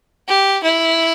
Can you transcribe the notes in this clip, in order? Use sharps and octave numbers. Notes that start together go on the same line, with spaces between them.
G4
E4